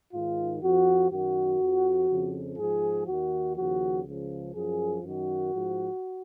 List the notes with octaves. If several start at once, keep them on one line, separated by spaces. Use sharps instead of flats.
G#2 D#3 F4
F2 F3 F#4
F#2 D#3 F#4
F2 F3
F2 C#3 F3
G#2 F3 G#4
D#2 D#3 F#4
D#2 C#3 F3 F#4
C#2 C#3 F3
F#2 F3 G#4
F#2 D#3 F#4
G#2 F3